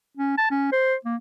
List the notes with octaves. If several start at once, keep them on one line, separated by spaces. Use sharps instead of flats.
C#4
A5
C#4
C5
A#3